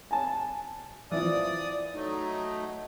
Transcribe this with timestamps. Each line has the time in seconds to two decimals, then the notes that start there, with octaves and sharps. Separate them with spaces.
0.11 G#5 A5
1.11 E3 F3 D5 D#6
1.95 F#3 A3 D#4